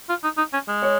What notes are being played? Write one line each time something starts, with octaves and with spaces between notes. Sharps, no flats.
F4
D#4
D#4
C#4
G#3
C#5